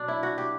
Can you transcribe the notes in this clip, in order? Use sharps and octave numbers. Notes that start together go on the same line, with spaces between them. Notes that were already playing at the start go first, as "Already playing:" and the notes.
Already playing: B2 F#3 D4
E4
F#4
G4